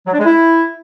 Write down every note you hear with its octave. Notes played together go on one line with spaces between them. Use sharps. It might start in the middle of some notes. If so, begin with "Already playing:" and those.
F#3
D4
G#3
E4